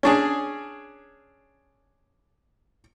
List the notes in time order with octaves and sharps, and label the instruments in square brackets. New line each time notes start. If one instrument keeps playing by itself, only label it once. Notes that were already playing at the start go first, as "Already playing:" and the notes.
[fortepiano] C#4 D4 G#4